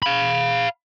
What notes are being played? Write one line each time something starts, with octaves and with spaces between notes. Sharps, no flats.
F5 B5